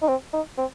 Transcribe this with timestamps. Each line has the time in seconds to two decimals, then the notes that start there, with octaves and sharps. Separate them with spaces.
0.02 D#4
0.08 C4
0.33 D#4
0.58 C4